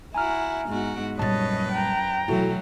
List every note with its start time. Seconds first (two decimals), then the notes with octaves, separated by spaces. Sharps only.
0.15 E4 F#4 G#5 A#5 F6
0.68 G#2 B3 F#4
1.19 F#2 A#2 G3 B4 C#5 D#5 A5 A6
1.72 G5 A#5
2.28 B1 E3 F#3 A3 E4 F#4 A4